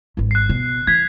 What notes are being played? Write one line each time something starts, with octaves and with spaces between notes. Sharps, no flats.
G#1 G2
F#6 C7
B2
E3 G#6 B6